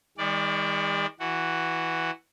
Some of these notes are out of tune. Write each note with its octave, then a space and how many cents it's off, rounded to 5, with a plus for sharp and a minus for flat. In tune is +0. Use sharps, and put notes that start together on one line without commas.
D#3 +35 G#3 -45 D5 +0
E3 +0 F#4 +0